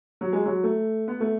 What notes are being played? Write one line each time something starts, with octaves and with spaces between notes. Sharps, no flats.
F#3
G#3
F#3
A3
B3
A3